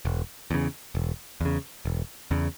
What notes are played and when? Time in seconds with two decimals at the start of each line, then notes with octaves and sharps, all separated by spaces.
0.05 E1
0.51 E2 C#3
0.95 E1
1.41 E2 C#3
1.85 E1
2.31 E2 C#3